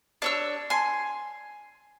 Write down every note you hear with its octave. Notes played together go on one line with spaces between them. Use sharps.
D4 C#5 E6
G#5 C6